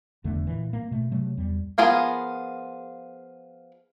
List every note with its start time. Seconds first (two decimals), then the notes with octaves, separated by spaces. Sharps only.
0.24 F1 E2 D3 A3
0.47 A#2 E3
0.73 A#3
0.91 B2 A3
1.12 C3 F#3 A3
1.37 E2 G3
1.78 F3 B3 F4 G#4 A#4